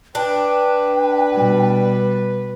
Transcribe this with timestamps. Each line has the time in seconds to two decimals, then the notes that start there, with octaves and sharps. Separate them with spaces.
0.15 D4 B4 G5
1.33 B2 G3